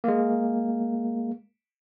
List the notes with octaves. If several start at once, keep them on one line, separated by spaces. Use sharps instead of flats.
G#3 A#3